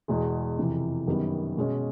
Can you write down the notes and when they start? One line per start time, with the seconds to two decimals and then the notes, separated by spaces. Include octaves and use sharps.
0.08 E2 B2 G#3
0.58 F2 C3 E3
1.07 F#2 D#3 G3 B3
1.57 B2 G#3 C#4